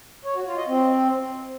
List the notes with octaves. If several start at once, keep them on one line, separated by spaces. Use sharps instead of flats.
C#5
F#4
F4
D#5
C4